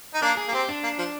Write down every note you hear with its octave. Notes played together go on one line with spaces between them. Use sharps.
D#4
A#3 D4 A#4
G#4
A#3
C4 G4
D4
A#3
F3